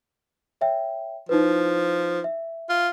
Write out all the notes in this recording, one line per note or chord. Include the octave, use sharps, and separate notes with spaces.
C#5 E5 G5
F3 D#4 E4 B4
E5
F4